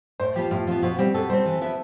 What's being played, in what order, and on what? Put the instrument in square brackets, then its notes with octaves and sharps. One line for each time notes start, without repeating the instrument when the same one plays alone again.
[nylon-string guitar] A2 [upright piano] C5
[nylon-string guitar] F3 [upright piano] G4
[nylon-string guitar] B3
[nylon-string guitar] A2 [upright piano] F4
[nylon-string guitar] F3 B3 [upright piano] C4
[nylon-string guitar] B2 [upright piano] C4
[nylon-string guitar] G3 C4 [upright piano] G4
[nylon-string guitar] B2 [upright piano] A4
[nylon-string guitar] G3 C4 [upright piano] C5
[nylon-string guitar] E3
B3 E4 B4 E5